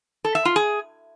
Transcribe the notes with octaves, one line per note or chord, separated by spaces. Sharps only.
A4
E5
F4
G#4